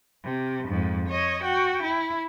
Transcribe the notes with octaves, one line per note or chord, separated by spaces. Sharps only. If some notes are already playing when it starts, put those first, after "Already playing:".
C3
F2 G#2
C#5 D#5
F#4 G5
E4